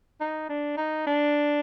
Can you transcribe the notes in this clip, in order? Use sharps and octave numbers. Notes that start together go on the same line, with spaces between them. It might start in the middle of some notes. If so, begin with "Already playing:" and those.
D#4
D4
D#4
D4